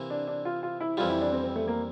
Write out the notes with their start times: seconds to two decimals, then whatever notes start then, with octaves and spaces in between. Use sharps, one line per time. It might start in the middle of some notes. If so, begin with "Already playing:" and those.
Already playing: C3 E3 A#3
0.10 D4
0.28 D4
0.45 F4
0.63 F4
0.80 E4
0.97 F2 E3 G3 F4
1.09 E4
1.21 D4
1.32 C4
1.44 C4
1.56 A3
1.68 A#3